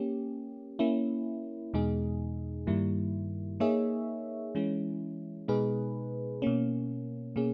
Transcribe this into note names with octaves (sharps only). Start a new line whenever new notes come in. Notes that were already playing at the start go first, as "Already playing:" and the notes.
Already playing: A#3 C#4 G4
A#3 C#4 E4
E2 B2 G#3 D#4 G#4
G2 D#3 G3 A#3 E4
A#3 D#4 G#4 C#5 E5
E3 G#3 C#4 E4
B2 G#3 D#4 G#4 B4
B2 A#3 C#4
B2 A#3 C#4 G#4